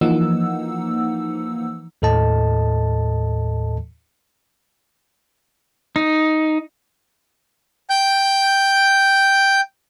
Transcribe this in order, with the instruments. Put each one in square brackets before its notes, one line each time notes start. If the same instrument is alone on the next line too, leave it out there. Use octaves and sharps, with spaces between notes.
[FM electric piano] E3 F3 A#3 D#4 F#5 E6
[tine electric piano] D#2 A2 A4 D#5 A5
[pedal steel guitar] D#4
[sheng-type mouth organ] G5 G6